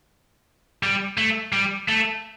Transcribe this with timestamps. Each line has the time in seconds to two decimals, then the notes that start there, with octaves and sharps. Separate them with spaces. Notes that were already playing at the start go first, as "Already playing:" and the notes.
0.83 G3
1.18 A3
1.53 G3
1.88 A3